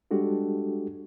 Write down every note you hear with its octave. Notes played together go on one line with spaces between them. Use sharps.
G3 G#3 D4 F#4 G4 A4